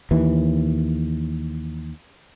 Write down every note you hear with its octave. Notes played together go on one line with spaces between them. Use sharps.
D#2 E3